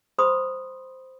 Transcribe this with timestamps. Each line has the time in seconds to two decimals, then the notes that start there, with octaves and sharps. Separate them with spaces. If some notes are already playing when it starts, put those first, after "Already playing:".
0.18 C5 B5 C6 D#6